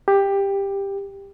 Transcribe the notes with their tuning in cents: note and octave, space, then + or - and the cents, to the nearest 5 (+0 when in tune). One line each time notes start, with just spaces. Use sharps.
G4 +10